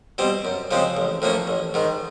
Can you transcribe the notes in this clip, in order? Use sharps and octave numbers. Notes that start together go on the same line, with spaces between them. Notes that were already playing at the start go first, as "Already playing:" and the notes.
B2 G3 C4
F#2
C#3 F3 G#3 C4
A1
A2 F3 A#3 C#4
A1
G#2 D#3